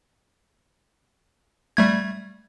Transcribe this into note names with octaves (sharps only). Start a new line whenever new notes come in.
G3 A3 G#6